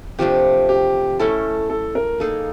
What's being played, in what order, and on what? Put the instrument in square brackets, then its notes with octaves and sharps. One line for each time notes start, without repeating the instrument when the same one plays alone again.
[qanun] C3 F3 A3 D4 [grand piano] G4
[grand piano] G4
[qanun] A3 C#4 E4 [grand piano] A4
[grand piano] A4
A#4
[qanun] A#3 D#4 G#4 [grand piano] A4